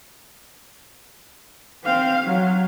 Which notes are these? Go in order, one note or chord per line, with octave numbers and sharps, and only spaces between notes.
C4 F5
F#3